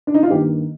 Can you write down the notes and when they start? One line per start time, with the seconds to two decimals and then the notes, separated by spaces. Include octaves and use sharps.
0.07 D4
0.14 D#4
0.23 F4
0.30 G2 D#3 A#3 G4